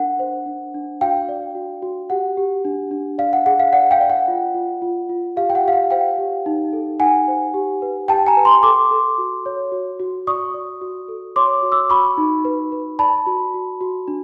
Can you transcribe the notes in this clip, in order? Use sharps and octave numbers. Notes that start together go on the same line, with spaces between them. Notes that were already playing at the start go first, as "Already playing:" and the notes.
Already playing: D4 A#4 F#5
C5
D4
D4
F#4 F5 G5
D5
F#4
F#4
G4 F#5
G4
D4
D4
D5 F5
F#5
G#4 F#5
F5
D5 F#5
F5 G5
D5
F#5
F4
F4
F4
F4
G4 F5
G5
F#5
G4 F5
F#5
C5 F5 G5
G4
D#4
A4
D#4 F#5 G#5
C5
G4
B4
G4 G5 A5
G#5 A#5
B4
A#5 C6
A4 C6 D6
A4
F#4
C#5
F#4
F#4
D5 C#6 D#6
D5
F#4
A4
C#5 C6 D6
F#4
D6 E6
F#4 B5 C#6
D#4
B4
B4
D5 A5 B5
F#4
F#4
F#4
D4